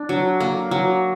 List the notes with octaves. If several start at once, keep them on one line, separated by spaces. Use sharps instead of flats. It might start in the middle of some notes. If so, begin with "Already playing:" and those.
Already playing: D4
F#3
A#3
F#3